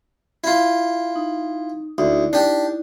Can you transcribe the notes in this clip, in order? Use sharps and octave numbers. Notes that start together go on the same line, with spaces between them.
E4 F4
D#4
D2 D#4 E4 D5
D4 G4